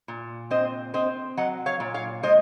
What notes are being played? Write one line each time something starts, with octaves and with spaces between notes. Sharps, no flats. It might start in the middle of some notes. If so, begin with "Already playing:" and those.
A#2
C4 C5 D#5
C4 C5 D#5
F#3 D#5 F#5
C#5 F5
A#2
C#5 F5
G#3 C5 D#5